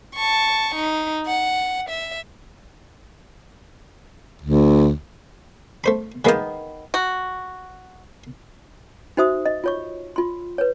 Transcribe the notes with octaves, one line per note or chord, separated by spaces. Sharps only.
A5 C#6
D#4
F#5
E5
D2
A3 C5 B5
D#3 E3 G#3 A#3 B3
F#4
D#4 F#4 C5 E5 D#6
D#5
F4 C#5 C#6
F4 C6
B4 C#5